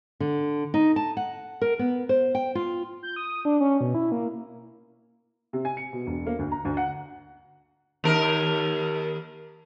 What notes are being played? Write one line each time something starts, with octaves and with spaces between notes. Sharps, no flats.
D3
D#4
A5
F#5
A#4
B3
C5
G5
F4
G6
D#6
D4
C#4
B2
E4
A#3
C3
G#5
C#7
B2
E1
A#3
D2
A#5
D2
F#5
D#2 A#4